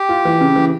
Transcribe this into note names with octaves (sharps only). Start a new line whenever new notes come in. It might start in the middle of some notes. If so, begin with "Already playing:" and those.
Already playing: G4
F4
E3
C#3
E3